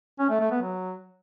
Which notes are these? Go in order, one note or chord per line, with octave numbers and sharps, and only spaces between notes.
C#4
A3
A3
B3
F#3